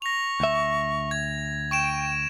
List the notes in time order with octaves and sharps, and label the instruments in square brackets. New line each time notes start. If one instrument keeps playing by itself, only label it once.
[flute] C#6 [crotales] A#6 F7
[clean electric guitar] D2 E5
[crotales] G#6
[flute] G5 [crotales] C#6 D7 E7